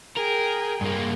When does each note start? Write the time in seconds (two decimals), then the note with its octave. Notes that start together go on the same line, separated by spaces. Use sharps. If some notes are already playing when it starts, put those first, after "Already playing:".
0.17 G#4 A#4 G5
0.81 G2 A#3